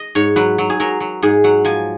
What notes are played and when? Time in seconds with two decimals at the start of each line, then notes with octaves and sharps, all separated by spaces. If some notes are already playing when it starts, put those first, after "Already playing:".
Already playing: D#5
0.15 G#2 C#5
0.36 F#3 B4
0.58 F#3
0.70 G#4
0.80 F#3 A#4
1.00 F#3
1.23 G#2 G#4
1.44 F#3 F#5
1.65 F3 G#5